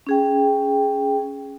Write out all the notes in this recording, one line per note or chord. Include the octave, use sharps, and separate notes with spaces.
C#4 G#4 G5